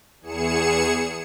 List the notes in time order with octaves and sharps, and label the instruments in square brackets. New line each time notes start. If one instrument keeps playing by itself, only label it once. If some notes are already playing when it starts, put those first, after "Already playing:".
[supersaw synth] E2 G#4 C#7 E7